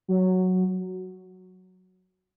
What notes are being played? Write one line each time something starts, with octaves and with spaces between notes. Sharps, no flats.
F#3